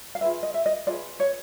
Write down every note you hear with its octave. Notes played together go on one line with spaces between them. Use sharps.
F5
F4 G#4 B4 E5
D#5
E5
D#5
F4 G#4 B4 D5
C#5